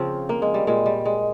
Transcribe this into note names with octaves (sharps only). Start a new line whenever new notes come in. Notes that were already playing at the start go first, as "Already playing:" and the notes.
Already playing: C#3 F3 C4
A#3
G#3
G3
A#2 G3 G#3
G3
G#3